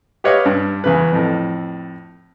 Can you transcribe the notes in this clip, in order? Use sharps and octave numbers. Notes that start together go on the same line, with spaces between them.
G4 B4 C#5 D#5 F5
G2
E2 C#3 B4
F2 A2